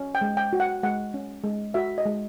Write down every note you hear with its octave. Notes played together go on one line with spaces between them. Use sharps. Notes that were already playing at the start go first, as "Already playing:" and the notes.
Already playing: C#4
G5
G#3
G5
F#4
F#5
G#3 F#5
C#4
G#3
F#4 E5
D#5
G#3